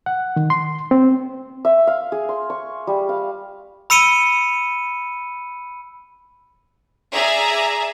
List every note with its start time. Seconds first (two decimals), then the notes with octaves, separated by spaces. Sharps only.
0.06 F#5
0.36 D#3
0.50 C6
0.91 C4
1.65 E5
1.87 F5
2.12 G#4
2.29 C6
2.50 C#6
2.87 G3
3.09 F5
3.90 B5 E6 C#7 D#7 G7
7.13 G#4 D5 E5 G#5 A#5